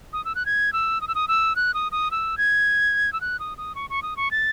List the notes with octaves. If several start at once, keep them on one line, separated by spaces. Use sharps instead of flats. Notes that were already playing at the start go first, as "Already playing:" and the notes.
D#6
E6
F#6
G#6
E6
D#6
E6
D#6
E6
F#6
D#6
D#6
E6
G#6
E6
F#6
D#6
D#6
C#6
C#6
D#6
C#6
A6